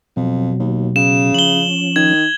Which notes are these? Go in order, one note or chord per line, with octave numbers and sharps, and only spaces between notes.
F2 B2 F#3
D#2
C#3 E7
F3 C#4 F#7 G7
D#3 G#6